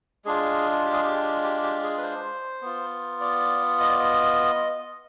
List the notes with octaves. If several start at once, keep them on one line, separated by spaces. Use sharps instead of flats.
G#3 D4 F4 G#4
G4
G#4
G4
G4
G4
G#4
B4
C5
B3 F4
D5
D#5
D5
D#5